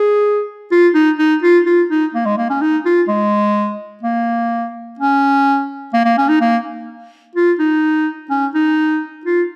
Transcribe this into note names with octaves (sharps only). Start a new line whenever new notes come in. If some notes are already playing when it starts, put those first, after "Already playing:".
Already playing: G#4
F4
D#4
D#4
F4
F4
D#4
A#3
G#3
A#3
C#4
D#4
F4
G#3
A#3
C#4
A#3
A#3
C#4
D#4
A#3
F4
D#4
C#4
D#4
F4